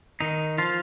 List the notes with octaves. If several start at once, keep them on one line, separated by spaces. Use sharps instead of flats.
D#3 D#4
F3 F4